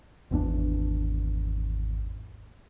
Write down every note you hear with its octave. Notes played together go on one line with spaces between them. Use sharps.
G#1 E2 C4 D4